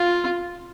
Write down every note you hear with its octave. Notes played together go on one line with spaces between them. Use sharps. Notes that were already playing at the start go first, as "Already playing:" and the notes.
Already playing: F4